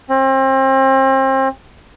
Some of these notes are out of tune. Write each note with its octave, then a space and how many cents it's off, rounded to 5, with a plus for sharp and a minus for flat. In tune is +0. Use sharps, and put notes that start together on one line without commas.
C4 +35